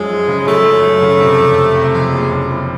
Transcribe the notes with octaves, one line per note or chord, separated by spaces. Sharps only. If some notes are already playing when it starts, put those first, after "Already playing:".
Already playing: F#2 F3 G#3
F3
C#3
F#2 A3
F#2
F#2
C#3
C3
F2
F3
C3
F2 G#3
F#1
F#1
F3